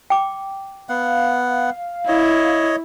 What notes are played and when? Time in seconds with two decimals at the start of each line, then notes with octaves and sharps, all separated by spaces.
0.10 G5 D6
0.89 B3 F5 F#5
2.08 E4 C#5 D#5